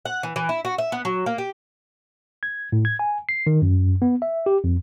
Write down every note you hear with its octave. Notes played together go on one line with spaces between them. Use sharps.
F#5
E3
E3
E4
F#4
E5
B3
F#3
A#3
G4
G#6
A2
G#6
G#5
C7
D#3
F#2
B3
E5
G4
F2